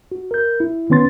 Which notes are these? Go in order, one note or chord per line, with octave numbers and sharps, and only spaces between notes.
F#4
A#4 G6
E4
D#3 B3 C#4 B4 C6 A6